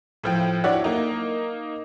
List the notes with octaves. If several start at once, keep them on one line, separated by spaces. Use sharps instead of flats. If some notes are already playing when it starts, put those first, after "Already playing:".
A2 F3 G5
F#3 D4 E4 C#5 D5 F#5
A#3 D#4